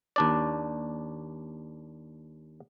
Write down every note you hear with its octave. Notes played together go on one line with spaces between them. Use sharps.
D#2 D4 D5